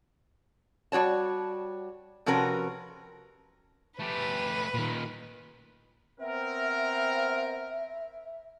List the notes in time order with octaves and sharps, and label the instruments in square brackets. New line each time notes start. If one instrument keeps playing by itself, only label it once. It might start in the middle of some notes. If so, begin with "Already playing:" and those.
[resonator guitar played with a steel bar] G3 F#4 C#5 A5
C3 F3 C#4 F#4 A#4 B4
[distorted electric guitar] A3 G4 [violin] B4
[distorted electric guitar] A#2 D#3
[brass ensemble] B3 C4 A#4 [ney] E5